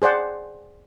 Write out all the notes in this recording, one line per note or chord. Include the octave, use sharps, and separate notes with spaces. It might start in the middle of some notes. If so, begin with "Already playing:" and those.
G#4 C5 D5 F#5